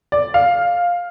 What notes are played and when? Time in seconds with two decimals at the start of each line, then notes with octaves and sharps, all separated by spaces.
0.12 D5
0.34 F5